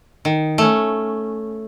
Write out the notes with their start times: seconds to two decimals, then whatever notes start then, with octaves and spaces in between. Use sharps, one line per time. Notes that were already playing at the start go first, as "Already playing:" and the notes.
0.25 D#3
0.58 A3 C#4